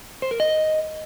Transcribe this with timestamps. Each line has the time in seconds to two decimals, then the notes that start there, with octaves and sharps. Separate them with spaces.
0.22 C5
0.31 A#4
0.40 D#5